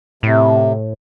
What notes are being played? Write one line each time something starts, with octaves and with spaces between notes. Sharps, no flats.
A2 C3